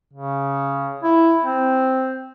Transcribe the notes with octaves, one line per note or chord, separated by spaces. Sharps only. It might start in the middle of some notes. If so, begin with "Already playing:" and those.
C#3
E4
C4